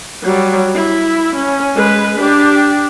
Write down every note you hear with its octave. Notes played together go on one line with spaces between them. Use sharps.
F#3 G3
E4
C#4
G#3 B4
D4 G4